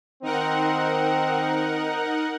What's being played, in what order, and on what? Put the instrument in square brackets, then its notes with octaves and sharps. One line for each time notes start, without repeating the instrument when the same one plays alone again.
[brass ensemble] D#3 C4 [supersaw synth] D#4 A#4 F#5